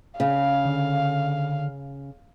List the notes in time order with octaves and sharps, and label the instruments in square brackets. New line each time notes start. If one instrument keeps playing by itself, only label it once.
[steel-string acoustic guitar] C#3 [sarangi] F5
[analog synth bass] D3